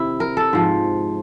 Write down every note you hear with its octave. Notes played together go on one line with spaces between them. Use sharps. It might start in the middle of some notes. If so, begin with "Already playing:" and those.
Already playing: C3 D#3 E4
A#4
A4
G#2 F3